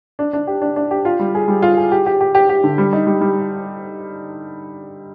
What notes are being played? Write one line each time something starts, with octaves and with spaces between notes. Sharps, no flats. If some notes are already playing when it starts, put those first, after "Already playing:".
D4
D4
G4
D4
D4
G4
F4
G3
G#4
G3
F4
G#4
G4
G4
G4
G4
G4
D3
G3
D#4
G3
G3